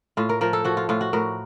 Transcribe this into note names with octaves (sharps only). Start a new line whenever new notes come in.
A2 F4
A#4
F3 A#4
A4
F3 F#4
F4
A2 F4
F#4
A2 A#4